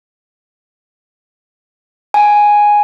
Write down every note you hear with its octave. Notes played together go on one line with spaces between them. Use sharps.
G#5